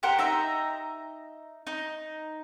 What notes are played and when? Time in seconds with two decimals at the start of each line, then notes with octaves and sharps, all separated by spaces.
0.03 G4 A#4 C5 F#5
0.19 D#4 E5 A#5
1.67 D#4